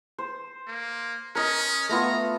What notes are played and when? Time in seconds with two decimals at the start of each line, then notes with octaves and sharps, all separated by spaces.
0.18 C5
0.67 A#3
1.35 C#4 A#4 D#5
1.89 A3 B3 F4 A#5